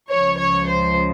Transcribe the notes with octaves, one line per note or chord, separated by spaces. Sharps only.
C#2 C#3 F3 C#5
C#5
C5